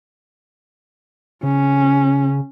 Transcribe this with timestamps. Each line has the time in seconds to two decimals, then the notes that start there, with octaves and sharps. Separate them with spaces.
1.43 C#3 C#4